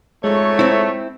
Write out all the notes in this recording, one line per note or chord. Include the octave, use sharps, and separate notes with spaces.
F2 G#2 G#3 A3 C#5
C4 E4